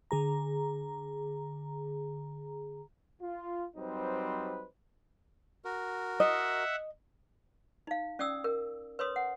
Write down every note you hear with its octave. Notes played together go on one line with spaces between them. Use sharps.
D3 G#4 A#5
F4
F#3 G3 C4 D#4 B4 C5
F#4 A#4
D#5 E5 F#5
D#4 F5
C#4 D5 G5 D#6 E6
A#4
B4 C#5 C6 D#6
F#5